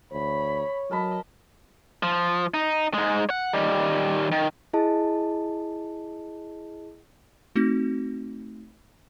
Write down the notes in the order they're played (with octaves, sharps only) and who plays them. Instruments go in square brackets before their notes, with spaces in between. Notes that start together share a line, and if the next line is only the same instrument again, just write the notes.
[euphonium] D2 [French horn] C#5 [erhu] B5
[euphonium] F#3 [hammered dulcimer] A#4 A5 B5 [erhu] D#5
[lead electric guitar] F3
D#4
G#2 G#3
F#5
D#3 G3
D#3
[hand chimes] E4 G#4 D#5 A5
[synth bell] A3 C4 D#4 F#4 A#6